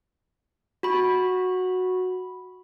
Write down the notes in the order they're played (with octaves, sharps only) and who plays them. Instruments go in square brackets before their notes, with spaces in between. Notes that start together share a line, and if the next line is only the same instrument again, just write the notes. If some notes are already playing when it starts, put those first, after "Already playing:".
[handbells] F#4 B5